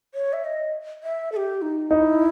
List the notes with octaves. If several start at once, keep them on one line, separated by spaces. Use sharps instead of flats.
C#5
E5
D#5
E5
A4
G4
D#4
D#4 E4